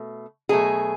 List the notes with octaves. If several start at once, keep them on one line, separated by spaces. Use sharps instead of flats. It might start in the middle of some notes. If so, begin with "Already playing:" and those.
Already playing: B2 A3
B2 F#3 A3 G#4